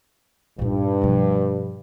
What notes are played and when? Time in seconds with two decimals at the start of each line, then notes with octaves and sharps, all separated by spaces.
0.59 G2 A#2 D#4
1.01 B2 F3